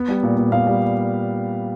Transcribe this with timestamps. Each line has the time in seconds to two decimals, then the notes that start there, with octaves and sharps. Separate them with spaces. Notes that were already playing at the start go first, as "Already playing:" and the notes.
Already playing: B3
0.08 G3
0.23 A#2
0.37 A#2
0.52 A#2 F5
0.67 G3